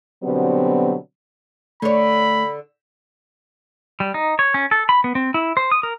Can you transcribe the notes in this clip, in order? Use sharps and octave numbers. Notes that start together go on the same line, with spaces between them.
B2 D3 F#3 G3 B3 C4
D3 A3 C#5 B5
G3
D#4
C#5
C#4
A4
B5
B3
C4
E4
C5
D#6
A#4